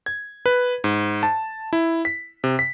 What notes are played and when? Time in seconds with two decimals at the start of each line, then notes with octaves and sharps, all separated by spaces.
0.06 G#6
0.46 B4
0.84 G#2
1.23 A5
1.73 E4
2.05 B6
2.44 C3
2.59 B6